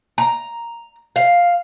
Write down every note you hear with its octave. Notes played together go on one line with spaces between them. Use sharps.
A#5
F5